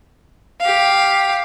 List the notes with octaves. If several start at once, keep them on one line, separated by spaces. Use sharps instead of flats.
G4 F5